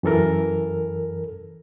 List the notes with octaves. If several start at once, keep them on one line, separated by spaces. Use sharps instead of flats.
F#2 E3 A4 A#4